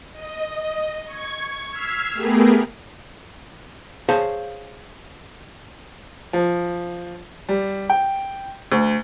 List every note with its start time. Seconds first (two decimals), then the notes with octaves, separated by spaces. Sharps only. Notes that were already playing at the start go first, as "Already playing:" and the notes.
0.12 D#5
1.04 C#6 G#6
1.70 E6 F6 G#6 B6 C7
2.13 A3 B3 G4 G#4 A#4 B4
4.09 G#4 C5 C#5 F5 A5
6.33 F3
7.49 G3
7.90 G5
8.72 D2